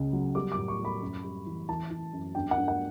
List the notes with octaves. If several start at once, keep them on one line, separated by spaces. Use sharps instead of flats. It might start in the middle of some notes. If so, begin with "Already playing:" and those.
Already playing: C#2 C#3
F#3
G3 D6
D6
A2
C#6
G3
B5
F#2
G3
E3
E3 A5
E3
F#2
G2 G5
F#5
G2
F#5